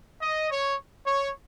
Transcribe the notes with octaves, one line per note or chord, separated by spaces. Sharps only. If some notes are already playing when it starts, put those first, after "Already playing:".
D#5
C#5
C#5